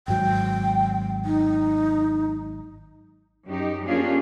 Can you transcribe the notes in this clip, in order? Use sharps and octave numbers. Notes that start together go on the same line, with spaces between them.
G#1 G#2 F#3 G5
D#4
F#2 D#4 G4
A#3 C#4 D4 F4 G4 G#4